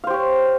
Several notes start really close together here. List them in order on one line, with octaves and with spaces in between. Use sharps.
F5 C5 G4 C#5